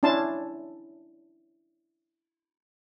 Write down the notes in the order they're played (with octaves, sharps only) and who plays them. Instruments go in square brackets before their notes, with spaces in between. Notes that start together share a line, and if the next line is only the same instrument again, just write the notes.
[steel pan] C#4 D4 E4 A5 C6